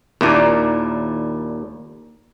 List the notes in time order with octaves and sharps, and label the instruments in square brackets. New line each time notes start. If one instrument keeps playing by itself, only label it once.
[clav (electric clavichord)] D#2 A#2 [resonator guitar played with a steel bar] D4 E4 A#4